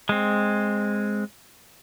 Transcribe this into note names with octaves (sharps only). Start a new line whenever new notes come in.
G#3 C4